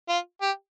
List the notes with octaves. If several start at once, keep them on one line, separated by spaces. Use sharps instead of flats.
F4
G4